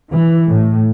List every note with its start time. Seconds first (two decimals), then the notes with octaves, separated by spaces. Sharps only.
0.11 E3
0.50 A2